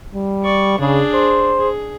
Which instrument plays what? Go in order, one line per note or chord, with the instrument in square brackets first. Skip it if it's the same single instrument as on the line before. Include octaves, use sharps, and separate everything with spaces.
[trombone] G3
[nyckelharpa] D5 C#6
[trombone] C#3 [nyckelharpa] D4 G#4
[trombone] C5
[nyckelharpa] G#4